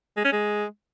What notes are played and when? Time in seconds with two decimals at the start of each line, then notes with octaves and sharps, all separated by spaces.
0.17 G#3
0.25 C#4
0.33 G#3